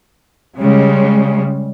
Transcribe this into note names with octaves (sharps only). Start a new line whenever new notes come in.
C#3 G3 G#3